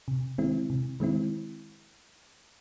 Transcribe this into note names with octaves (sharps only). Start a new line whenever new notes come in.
C3
D#3 G#3 C4 E4
C3
D#3 G#3 C4 E4